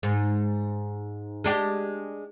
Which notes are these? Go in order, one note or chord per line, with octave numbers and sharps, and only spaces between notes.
G#2
G#3 D4 G4